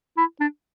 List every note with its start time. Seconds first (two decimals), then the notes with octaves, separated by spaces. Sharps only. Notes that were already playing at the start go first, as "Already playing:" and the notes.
0.17 E4
0.40 D4